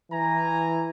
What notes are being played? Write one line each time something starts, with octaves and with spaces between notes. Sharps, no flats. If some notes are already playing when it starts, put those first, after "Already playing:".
E3 G#5 A#5